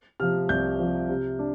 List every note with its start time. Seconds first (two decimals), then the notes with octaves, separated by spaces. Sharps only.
0.20 C3 F3 F6
0.49 C2 G6
0.80 C3 F3
1.09 C3
1.39 D4